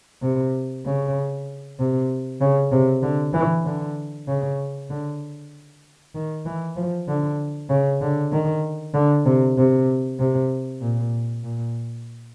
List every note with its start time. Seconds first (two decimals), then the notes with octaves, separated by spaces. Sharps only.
0.22 C3
0.85 C#3
1.79 C3
2.41 C#3
2.72 C3
3.02 D3
3.33 E3
3.65 D3
4.28 C#3
4.90 D3
6.15 D#3
6.46 E3
6.76 F3
7.08 D3
7.70 C#3
8.01 D3
8.32 D#3
8.94 D3
9.26 C3
9.58 C3
10.19 C3
10.81 A#2
11.43 A#2